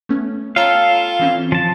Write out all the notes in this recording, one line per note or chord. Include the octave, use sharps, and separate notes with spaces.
A3 B3 C#4
F4 A4 C#5 F5 G5 A#5
E3 C4 C#4
F3 A5